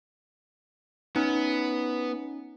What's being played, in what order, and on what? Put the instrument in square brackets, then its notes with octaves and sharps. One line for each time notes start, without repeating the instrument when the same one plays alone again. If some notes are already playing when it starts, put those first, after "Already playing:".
[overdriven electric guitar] B3 [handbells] C#4 D#4